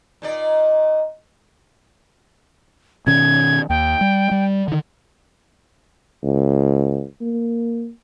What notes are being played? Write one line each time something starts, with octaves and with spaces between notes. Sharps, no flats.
A#2 D#4 D5
B2 D#3 C#4 G#6
D#2 G5
G3
G3
D3 D#3
C#2
A#3